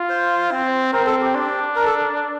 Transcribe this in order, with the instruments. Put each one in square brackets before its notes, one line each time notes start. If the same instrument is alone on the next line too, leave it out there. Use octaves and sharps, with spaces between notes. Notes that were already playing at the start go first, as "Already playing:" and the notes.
Already playing: [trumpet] F4
[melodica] C5
[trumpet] C4
[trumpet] C4 [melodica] A#4
[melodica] A4
G4
[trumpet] D4
[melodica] A#4
A4